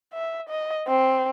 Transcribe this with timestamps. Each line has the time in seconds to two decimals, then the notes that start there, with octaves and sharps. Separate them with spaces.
0.13 E5
0.48 D#5
0.88 C4